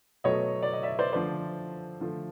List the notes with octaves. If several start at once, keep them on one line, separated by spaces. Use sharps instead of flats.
B2 F#3 A3 C#5 D#5
D5
D#5
D5 E5
C5 D5
D3 F3 A3 C5 D5
D3 F3 A3